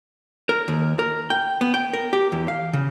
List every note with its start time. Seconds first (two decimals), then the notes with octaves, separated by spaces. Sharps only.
0.49 A#4
0.68 D#2
0.99 A#4
1.30 G5
1.61 B3
1.74 G5
1.93 A#4
2.13 G4
2.32 E2
2.48 F5
2.73 C#3